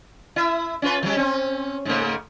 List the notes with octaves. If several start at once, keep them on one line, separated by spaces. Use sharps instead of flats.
E4 E5
C#4 F4 B4
E3 F#3 G3
C4 C#4
G#2 C#3 A3